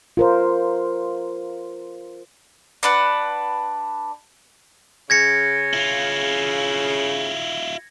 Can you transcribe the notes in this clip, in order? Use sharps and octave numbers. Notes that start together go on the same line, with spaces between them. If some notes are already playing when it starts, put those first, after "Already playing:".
F4 A#4 C5
D4 B4 F#5
C#3 G#6 A#6 C#7
E4 F4